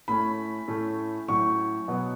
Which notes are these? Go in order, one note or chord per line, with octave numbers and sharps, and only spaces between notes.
A2 A3 C#4 B5
A2 A3 C#4
A2 F#3 C#4 C#6
B2 F#3 B3